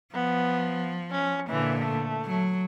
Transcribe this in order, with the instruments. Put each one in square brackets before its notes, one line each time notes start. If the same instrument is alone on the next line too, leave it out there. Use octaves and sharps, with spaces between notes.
[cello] F3 [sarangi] B3
[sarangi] C#4
[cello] A#2 D3 [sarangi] E3
[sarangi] A3
[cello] F#3